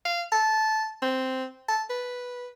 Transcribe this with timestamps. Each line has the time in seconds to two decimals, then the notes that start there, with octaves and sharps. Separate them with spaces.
0.05 F5
0.32 A5
1.02 C4
1.68 A5
1.90 B4